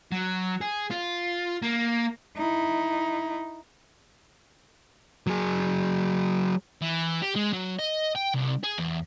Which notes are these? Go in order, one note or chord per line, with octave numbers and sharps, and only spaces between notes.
F#3
G#4
F4
A#3
D#4 E4
F#3 G#4
E3
G4
G#3
F#3
D#5
G5
C2
G#4
E2